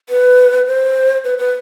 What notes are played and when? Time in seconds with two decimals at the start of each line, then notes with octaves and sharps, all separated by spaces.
0.09 B4
0.66 C5
1.24 B4
1.38 B4